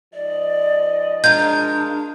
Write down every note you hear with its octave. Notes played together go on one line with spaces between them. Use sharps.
G#2 F3 D5 D#5
G#3 D4 F4 A#4 G6